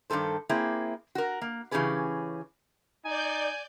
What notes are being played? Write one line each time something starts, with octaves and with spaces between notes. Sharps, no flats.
G2 B2 D#3 A4 C5
A#3 C4 E4 G#4
F#4 A#4
A#3
C#3 E3 C#4 G4 G#4 B4
D#4 D5 G#5 G6